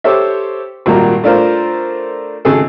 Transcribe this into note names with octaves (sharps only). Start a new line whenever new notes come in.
G4 A4 C5 C#5 E5
G#1 A#2 G3 A#3 F#4 A#5
A3 D4 F4 A#4 C5
G#1 C#3 G#4 A4